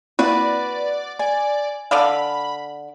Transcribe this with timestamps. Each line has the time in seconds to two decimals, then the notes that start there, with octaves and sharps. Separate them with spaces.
0.19 A#3 C4 E4 F#4 B4 D5
1.19 D5 G#5
1.91 D3 D5 F5 B5